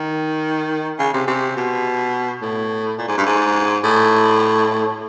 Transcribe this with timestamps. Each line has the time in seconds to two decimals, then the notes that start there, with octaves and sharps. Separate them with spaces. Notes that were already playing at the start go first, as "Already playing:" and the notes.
Already playing: D#3
0.99 C#3
1.14 C3
1.27 C3
1.57 B2
2.42 A2
2.98 A#2
3.08 G#2
3.17 G2
3.26 G#2
3.84 A2